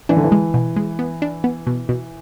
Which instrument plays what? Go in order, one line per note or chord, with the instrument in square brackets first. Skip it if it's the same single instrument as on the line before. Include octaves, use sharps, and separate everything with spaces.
[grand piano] E3 [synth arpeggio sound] D4
[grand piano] D3
E3
[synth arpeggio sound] G#3
B2
G#3
B3
D4
B3
B2
B2